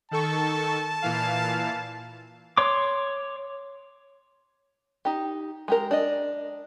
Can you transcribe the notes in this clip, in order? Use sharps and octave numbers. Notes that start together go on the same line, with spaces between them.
D#3 A4 A5 C#6
A#2 E3 F5
C#5 C6 D6
D#4 G4
G#3 G4 A#4
D4 D#5